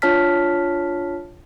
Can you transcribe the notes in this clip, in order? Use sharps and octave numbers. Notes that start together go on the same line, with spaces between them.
D4 F4 C#5 A5 F6 B6